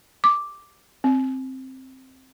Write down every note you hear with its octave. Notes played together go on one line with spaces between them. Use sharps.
D6
C4